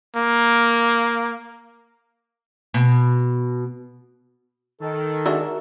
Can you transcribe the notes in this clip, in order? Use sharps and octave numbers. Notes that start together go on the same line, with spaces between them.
A#3
B2
D#3 A4
D3 G#3 D4 F#4 A#4 E5